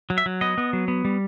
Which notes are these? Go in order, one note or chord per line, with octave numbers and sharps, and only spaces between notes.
F#3
E5
F#3
B3 D#5
B3
F#3
B3
G3